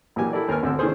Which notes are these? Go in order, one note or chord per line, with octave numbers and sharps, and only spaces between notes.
A#1 E3 F#3 A#3 G4 G#5
E4 G4 A4 A#4 D5
D#2 A#4 B4 G#5 F6
G#1 D2 D3 C4 A4 E6
D#3 E3 C#4 D4 G#4 C5